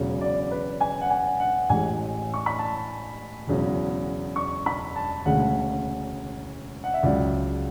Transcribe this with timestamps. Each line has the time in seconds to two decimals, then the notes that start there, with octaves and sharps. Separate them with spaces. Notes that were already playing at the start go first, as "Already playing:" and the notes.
Already playing: E1 E2 C#3 F#3
0.21 D5
0.51 B4
0.80 G#5
1.01 F#5
1.10 G#5
1.40 F#5
1.69 A1 A2 E3 G#3 G#5
2.34 C#6
2.46 B5
2.59 A5
3.47 E1 E2 C#3 F#3
4.36 C#6
4.66 B5
4.96 A5
5.25 E1 D2 C#3 G#3 F#5
6.84 F#5
6.94 E5
7.03 C#2 C#3 F#3 D5